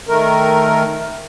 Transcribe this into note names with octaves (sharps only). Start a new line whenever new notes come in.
D#3 A3 A#4